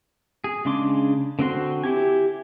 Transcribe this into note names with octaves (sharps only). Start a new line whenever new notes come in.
G#4
C#3 G#3 D4 C6 D6
D3 C4 F#4 C6
E4 G4 G#5